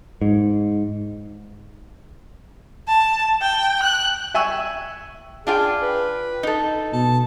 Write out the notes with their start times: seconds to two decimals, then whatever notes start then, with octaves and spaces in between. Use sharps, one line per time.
0.22 G#2
2.88 A5
3.42 G5
3.82 F#6
4.34 E5 G5 G#5 C#6 E6
5.47 D4 F4 G#4 G5
5.82 B4
6.43 D#4 A4
6.93 B2 A5